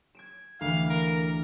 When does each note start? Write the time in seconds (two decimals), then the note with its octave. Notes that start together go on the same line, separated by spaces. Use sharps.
0.15 G#6 D7 E7
0.61 D2 E3 F5
0.90 A#4